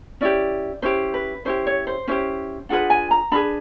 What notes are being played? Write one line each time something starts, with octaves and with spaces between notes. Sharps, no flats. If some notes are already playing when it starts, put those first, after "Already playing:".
C#4 E4 G4 D5
C#4 E4 G4 C5
B4
C#4 E4 G4 C5
C#5
C5
C#4 E4 G4 C5
D4 F4 G#4 B4 F#5
G#5
A#5
D4 F4 G#4 B4 B5